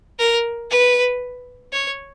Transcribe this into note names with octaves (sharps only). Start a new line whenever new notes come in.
A#4
B4
C#5